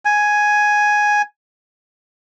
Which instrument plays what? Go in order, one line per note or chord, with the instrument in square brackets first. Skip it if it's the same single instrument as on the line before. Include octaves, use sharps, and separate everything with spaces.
[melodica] G#5